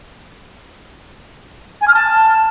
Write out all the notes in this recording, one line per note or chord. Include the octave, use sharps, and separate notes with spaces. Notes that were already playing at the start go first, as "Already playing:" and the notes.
G#5
F6
A5